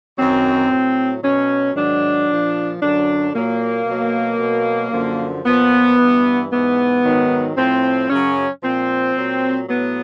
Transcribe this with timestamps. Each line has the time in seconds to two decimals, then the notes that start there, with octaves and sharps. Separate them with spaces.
0.17 F#2 D#3 F#3 C4
0.70 A2 F#3
1.23 B2 F#3 C#4
1.75 G#2 D#3 F#3 D4
2.29 A#2 F3
2.81 F#2 D3 F#3 D4
3.34 A#2 F#3 A#3
3.86 B2 F#3
4.40 B2 F#3
4.92 F#2 D3 F3
5.45 A#2 F3 B3
5.99 G2 E3
6.51 G#2 E3 B3
7.04 G#2 D#3 F#3
7.57 A2 F3 C4
8.09 F#2 C#3 F#3 C#4
8.62 A#2 F3 C4
9.16 A#2 F#3
9.68 A2 F#3 B3